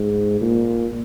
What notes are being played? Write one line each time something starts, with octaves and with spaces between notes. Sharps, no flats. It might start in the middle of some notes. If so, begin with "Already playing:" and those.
Already playing: G#2
A#2